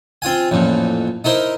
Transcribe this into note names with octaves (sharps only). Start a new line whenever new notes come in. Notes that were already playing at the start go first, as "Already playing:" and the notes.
C4 F4 F5 G#5
A1 F2 A#2
D#4 E4 A#4 C5